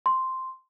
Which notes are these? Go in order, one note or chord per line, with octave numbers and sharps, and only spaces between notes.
C6